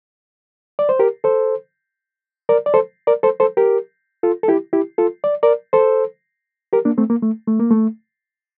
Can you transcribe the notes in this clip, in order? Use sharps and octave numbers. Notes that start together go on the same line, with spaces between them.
D5
C5
G4 A#4
A4 C5
A#4 D5
D5
A4 C5
A#4 D5
A4 C5
A4 C5
G4 A#4
F4 A4
A4
E4 G4
E4 G4
F4 A4
D5
A#4 D5
A4 C5
G4 A#4
A#3 D4
A3 C4
A#3
A3
A3
A#3
A3